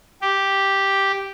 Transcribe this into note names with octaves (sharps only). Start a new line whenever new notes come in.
G4